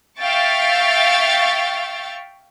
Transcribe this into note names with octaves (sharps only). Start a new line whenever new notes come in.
E5 F5 G5 C#6 A6